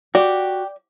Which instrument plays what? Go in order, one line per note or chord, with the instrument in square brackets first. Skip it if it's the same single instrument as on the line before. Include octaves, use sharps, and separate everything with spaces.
[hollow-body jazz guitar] F#4 [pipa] G4 [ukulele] D5